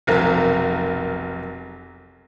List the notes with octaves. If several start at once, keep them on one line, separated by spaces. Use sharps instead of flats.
F1 B1 A#4